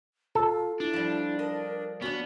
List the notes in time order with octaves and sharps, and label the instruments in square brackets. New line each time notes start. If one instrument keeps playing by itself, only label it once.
[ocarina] F4 [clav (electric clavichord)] A4
[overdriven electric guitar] D4 [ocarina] E4
[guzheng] F3 G3
[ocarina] A#4 [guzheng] D#5
[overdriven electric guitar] B3 [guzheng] C#4 D4 [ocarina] F#4